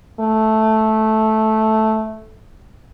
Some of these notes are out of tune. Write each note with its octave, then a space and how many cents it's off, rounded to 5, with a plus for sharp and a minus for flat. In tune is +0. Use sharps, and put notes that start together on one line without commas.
A3 -5